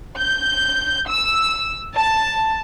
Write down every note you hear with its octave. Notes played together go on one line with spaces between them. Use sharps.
G6
E6
A5